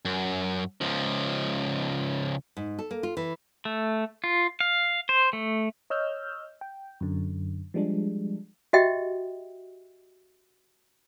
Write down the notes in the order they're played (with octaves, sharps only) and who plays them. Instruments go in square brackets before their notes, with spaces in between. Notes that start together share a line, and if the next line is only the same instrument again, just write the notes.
[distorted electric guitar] F#2
C#2 F3
[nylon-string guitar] G#2
A4
A#3
F4
E3
[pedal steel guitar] A3
F4
F5
C5
A3
[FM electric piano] C#5 D#5 E6 F6 G6
G5
F#2 D3
F3 G3 G#3 D4
[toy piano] F#4 G4 D#5 E5 F#5 G5